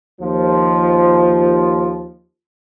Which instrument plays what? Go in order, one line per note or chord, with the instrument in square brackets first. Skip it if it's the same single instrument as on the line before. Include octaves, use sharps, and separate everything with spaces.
[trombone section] D#2 F3